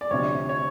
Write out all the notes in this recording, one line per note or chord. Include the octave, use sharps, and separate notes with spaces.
D5
D2 C3 F3 C#5
C#5